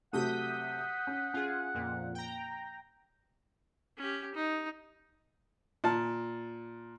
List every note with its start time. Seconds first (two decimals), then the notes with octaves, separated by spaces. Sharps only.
0.13 C3 F#3 A3 F#5 D#6 G6 B6
1.07 C#4
1.34 C#4 F4 G#4
1.74 F2 A#2
2.15 G5 A#5
3.98 C#4 G4
4.35 D#4
5.84 A#2 A5